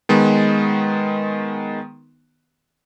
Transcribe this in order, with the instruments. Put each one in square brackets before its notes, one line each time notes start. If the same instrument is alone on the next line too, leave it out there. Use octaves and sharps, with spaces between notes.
[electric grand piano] D#3 G#3 B3